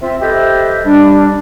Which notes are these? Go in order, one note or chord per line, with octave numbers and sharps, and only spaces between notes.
C4 F4 E5
G4 A4 B4 C5 D#5 E5
G3 D4